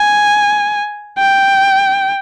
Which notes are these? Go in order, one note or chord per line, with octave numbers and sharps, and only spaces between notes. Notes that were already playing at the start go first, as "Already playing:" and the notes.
Already playing: G#5
G5